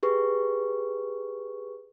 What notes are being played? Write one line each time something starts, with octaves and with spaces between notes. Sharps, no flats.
G4 G#4 B4 C#6